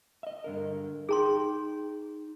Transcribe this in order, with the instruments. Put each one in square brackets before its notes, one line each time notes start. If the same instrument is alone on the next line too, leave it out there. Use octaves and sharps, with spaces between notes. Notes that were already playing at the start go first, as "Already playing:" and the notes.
[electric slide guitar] D#5 E5
G2 D3 A#4
[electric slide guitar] D#4 G5 [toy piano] G#4 A#5 C6